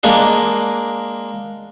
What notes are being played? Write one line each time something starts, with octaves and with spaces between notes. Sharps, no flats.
G#3 A#3 D4 G#4